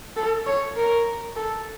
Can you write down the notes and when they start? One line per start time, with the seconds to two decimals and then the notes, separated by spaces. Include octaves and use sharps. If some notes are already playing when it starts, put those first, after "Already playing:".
0.16 A4
0.46 C#5
0.76 A#4
1.36 A4